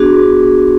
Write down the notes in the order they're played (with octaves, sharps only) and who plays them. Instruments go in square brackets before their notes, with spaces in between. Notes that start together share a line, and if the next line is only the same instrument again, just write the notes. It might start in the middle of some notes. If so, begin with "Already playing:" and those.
Already playing: [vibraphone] B3 D4 F#4 G#4